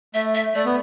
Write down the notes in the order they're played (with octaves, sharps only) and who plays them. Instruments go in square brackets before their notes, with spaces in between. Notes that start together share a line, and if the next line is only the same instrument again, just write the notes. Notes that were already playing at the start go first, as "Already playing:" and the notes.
[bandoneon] A3 [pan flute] E5
[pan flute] E5
[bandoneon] A3 [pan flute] D5
[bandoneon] B3